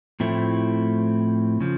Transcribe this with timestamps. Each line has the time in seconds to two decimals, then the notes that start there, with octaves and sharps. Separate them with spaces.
0.20 A2 F3 A3 C4 E4
1.60 C#3 F3